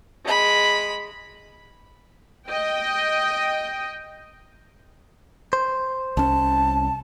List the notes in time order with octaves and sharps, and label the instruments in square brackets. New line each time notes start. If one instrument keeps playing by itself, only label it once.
[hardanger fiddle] G#3 B5
[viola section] D#5 G5
[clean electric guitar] C5
[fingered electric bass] C2 C#4 [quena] A5